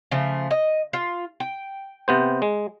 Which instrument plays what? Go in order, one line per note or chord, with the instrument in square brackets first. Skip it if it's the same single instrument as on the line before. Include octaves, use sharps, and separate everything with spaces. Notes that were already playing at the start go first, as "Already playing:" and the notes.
[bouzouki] C#3 F3 A3
D#5
F4
G5
[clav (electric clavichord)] C3 B3 C5
G#3